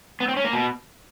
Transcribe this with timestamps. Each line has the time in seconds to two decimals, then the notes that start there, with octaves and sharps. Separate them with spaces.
0.20 B3
0.28 C4
0.37 C#4
0.45 A#3
0.53 B2